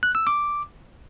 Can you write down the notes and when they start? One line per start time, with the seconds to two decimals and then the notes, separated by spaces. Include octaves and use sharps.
0.03 F#6
0.15 E6
0.27 D6